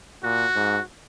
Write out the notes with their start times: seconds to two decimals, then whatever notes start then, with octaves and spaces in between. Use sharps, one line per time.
0.23 A#2 F#4
0.55 G#2